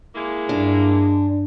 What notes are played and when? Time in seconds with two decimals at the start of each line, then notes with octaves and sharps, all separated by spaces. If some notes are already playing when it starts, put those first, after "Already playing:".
0.15 G#3 A#3 E4
0.49 G2 D4